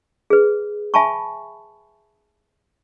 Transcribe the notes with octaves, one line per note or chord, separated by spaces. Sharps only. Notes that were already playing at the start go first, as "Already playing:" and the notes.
G#4 B4
E5 G#5 A5 B5 C#6